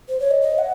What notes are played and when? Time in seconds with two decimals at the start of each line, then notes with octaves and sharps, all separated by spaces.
0.09 C5
0.20 C#5
0.31 D#5
0.42 D#5
0.58 F#5